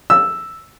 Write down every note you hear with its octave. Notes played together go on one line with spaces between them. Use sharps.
E6